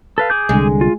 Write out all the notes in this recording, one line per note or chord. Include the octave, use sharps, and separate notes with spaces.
A4 B4 F5
G#4 D6 G6
C2 D3 G#3
F4